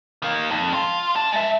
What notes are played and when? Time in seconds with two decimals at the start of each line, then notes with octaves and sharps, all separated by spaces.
0.22 D#3 A#3
0.50 F2
0.74 F4
1.16 D4 A5
1.33 G#3 E5